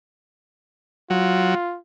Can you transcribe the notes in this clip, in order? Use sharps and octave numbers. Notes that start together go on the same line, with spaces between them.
F#3 F4